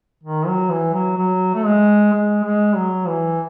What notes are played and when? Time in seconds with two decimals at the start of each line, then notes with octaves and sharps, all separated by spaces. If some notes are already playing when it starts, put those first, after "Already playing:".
0.23 D#3
0.47 F#3
0.71 E3
0.94 F#3
1.18 F#3
1.54 A3
1.65 G#3
2.13 G#3
2.44 G#3
2.76 F#3
3.07 E3